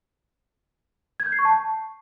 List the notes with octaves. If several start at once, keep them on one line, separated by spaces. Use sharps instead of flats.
G#6
G6
C7
C#6
A5